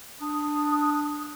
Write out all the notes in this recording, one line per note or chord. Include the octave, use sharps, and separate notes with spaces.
D4 D#6